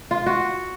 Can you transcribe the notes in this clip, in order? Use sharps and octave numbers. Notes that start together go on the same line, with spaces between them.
F4
F#4